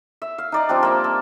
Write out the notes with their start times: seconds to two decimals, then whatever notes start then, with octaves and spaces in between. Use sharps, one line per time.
0.22 E5
0.38 F5
0.52 D#4 D5 A#5
0.69 F3 G3 C4 D4
0.83 A#3 E5
1.04 A5